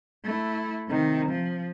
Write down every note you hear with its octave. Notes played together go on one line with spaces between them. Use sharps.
A3 E4
C3 D#3
F3